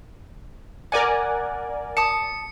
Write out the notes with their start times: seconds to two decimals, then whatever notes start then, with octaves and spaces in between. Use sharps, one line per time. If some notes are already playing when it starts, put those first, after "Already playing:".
0.92 A#4 D5 F#5 G#5
1.97 A5 D#6 C#7